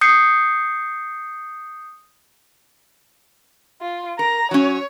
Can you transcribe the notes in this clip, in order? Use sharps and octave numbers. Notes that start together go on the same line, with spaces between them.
D#6 G6 C7 C#7
F4
A#4 A#5
F#3 C#4 C#5